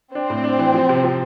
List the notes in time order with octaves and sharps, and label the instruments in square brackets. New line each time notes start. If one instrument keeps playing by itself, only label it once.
[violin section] C4 [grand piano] D4
[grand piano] A2
D4
E3
F3
C3
F3